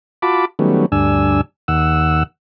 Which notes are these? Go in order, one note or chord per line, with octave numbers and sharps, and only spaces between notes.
F4 F#4 A5 B5 D6
D#3 F#3 G3 A3 B3 C#4
D2 G2 D4 G#5 E6
D#2 F#5 E6